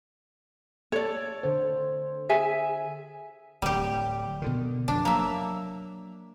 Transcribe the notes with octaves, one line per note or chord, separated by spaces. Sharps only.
A4 C#5 D5
D3 C5
G#4 E5 G#5
D1 G3 G4
B2 D3 D#3
F1 F2 D4
F#3 A#3 E5